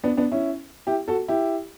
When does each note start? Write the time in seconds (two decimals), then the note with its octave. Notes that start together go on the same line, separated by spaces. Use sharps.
0.04 B3 D4
0.17 B3 D4
0.32 C#4 E4
0.87 E4 G4
1.08 F#4 A4
1.28 E4 G4